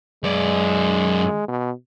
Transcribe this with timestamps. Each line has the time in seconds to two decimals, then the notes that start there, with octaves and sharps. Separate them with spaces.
0.24 F#2 G#3 D5
1.48 B2